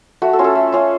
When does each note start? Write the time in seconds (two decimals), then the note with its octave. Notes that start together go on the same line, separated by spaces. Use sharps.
0.22 A3 F#4
0.33 A4
0.39 C#4 F4
0.44 A4
0.55 A3
0.72 C#4 F4